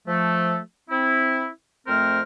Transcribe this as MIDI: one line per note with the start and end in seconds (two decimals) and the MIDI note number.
0.07 0.59 53
0.07 0.59 57
0.90 1.48 60
0.90 1.48 64
1.87 2.20 41
1.87 2.20 57
1.87 2.20 60
1.87 2.20 70
1.87 2.20 72
1.87 2.20 89